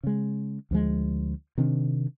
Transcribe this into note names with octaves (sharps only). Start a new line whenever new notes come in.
C#3 G#3
D2 F3 G#3
C3 D#3 C4 D4